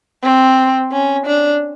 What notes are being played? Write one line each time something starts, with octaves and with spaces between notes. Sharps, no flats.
C4
C#4
D4